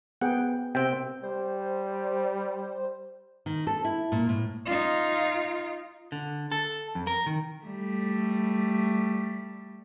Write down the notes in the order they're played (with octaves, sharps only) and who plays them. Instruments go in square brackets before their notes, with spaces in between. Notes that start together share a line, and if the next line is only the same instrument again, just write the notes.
[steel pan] B3 G#4 G5 [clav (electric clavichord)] F#5
[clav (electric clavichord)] C3 C4 [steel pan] G5
[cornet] G3 [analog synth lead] C5
[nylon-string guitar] D#3
A4
E4
A#2
A2
[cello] D#4 F4
[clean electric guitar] D3
A4
F2
A#4
D#3
[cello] G3 A3